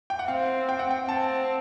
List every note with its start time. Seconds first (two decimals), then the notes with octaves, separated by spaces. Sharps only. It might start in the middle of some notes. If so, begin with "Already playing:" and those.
0.10 G5
0.19 F#5
0.28 C4 F5
0.69 G5
0.79 F#5
0.91 G5
1.09 C4 A5